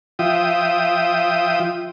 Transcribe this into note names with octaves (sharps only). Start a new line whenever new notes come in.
F3 F4 E5 G5 D#6